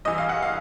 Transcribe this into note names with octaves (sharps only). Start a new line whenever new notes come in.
G2 E3 D#5
F5
F#5
F5